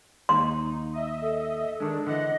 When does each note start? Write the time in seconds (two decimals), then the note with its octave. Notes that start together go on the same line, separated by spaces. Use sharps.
0.29 D#2 D#4 C6
0.93 D#5 E5
1.21 A4
1.80 D#3 G#3 D4
2.07 D3 E3 D#5 F#5